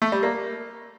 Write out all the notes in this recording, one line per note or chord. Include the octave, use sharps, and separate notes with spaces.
A3
G3
A#3